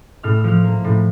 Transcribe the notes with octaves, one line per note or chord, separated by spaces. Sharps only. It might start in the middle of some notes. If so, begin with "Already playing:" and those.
A2 F6
E6
F3 F6
A#3
A2